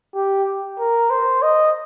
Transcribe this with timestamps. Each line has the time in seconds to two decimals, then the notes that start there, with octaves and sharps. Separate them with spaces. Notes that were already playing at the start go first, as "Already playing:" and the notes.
0.15 G4
0.79 A#4
1.10 C5
1.42 D#5